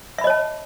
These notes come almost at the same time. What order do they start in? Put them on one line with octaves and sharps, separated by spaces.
E5 B5 D#5 C#5 A5